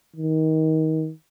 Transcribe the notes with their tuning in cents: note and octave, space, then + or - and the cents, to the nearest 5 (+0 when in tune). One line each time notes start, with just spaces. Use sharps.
D#3 +25